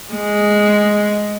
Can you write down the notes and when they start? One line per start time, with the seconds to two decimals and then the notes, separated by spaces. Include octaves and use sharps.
0.13 G#3